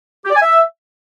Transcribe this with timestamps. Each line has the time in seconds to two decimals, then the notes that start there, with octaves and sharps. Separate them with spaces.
0.25 G4
0.31 D5
0.36 G#5
0.42 E5